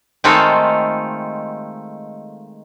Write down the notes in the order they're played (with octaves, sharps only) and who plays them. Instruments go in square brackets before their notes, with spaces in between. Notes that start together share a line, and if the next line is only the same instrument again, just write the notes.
[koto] D#3 G#3 A3 C4 F4 A4